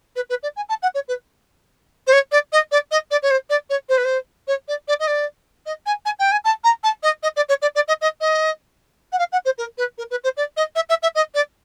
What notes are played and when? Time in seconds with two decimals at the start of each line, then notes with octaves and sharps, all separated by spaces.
0.16 B4
0.30 B4
0.43 D5
0.56 G#5
0.69 A5
0.82 F#5
0.94 C#5
1.08 B4
2.07 C5
2.12 C#5
2.32 D5
2.52 D#5
2.71 D5
2.91 D#5
3.11 D5
3.22 C#5
3.30 C5
3.49 D5
3.70 C#5
3.89 C5
3.97 B4
4.04 C5
4.47 C#5
4.68 D5
4.88 D5
5.00 D#5
5.07 D5
5.66 D#5
5.86 G#5
6.05 G#5
6.19 G5
6.31 G#5
6.44 A5
6.64 A#5
6.83 A5
7.03 D#5
7.23 D#5
7.36 D5
7.49 C#5
7.62 D5
7.75 D5
7.88 D#5
8.01 D#5
8.21 D#5
9.12 F#5
9.19 F5
9.32 F#5
9.45 C5
9.58 A#4
9.78 B4
9.98 A#4
10.10 B4
10.24 C5
10.37 D5
10.57 D#5
10.75 E5
10.89 E5
11.02 E5
11.15 D#5
11.34 D5